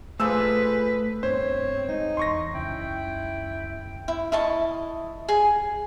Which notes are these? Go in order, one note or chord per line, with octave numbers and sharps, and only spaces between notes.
A#2 A3 G#4 A4 B4 C5 E6
G2 B3 C4 D4 C5 C#5
G#3 D#4 D#5
E2 C6 C#6 A#6
F#1 C#2 C#4 E4 G5
E4
E4 D#5 A5 C#6
G#4 G#5